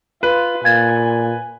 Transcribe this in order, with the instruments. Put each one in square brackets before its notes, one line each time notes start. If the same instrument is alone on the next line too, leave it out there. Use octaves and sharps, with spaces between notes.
[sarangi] F4 [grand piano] B4
[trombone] A#2 [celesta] F5 G#6 A6 [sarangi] G#5